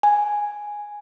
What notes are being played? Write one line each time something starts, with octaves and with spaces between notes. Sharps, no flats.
G#5